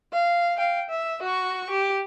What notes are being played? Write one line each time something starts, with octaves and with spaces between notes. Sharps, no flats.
F5
F5 G5
E5
F#4 C#6
G4